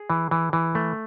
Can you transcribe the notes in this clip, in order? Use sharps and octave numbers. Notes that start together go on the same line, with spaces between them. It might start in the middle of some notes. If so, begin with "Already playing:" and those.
Already playing: G#4
E3
E3
E3
A3